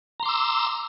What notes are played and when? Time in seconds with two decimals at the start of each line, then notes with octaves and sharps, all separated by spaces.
0.20 A#5
0.23 C6
0.26 D6
0.28 E6